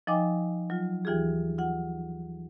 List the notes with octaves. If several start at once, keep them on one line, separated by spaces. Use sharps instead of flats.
F3 D#4 D#5 G5 G#5 D6
F#3 F4
D#2 E3 F4 G4 G#4
F4 F#5